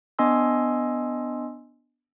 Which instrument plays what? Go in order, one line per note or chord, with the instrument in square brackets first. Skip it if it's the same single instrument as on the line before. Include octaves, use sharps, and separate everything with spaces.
[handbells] B3 D4 D#5 G#5 C6 E6